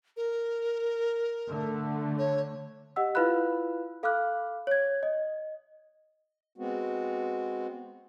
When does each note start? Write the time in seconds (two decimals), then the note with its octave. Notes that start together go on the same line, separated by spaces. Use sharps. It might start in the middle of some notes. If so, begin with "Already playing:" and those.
0.17 A#4
1.48 D3 A3
2.18 C#5
2.96 G4 D#5 F#5 E6
3.15 E4 F4 B4 F5 B5 F#6
4.03 A4 F5 B5 D6 F6 F#6
4.67 C#5 G#6
5.03 D#5
6.58 G#3 B3 C4 F#4